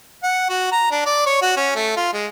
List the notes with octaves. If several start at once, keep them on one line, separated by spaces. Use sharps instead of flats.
F#5
F#4
A#5
D4
D5
C#5
F#4
C#4
A3
F4
G#3